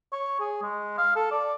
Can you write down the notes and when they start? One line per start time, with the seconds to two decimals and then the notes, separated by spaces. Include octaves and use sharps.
0.12 C#5
0.40 G#4
0.62 G#3
0.98 F5
1.16 A4
1.31 D5